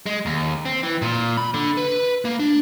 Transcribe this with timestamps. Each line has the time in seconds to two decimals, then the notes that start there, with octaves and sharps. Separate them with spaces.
0.06 G#3
0.26 D#2
0.65 C4
0.83 E3
1.02 A#2
1.37 B5
1.54 D3
1.77 B4
2.25 A#3
2.40 D4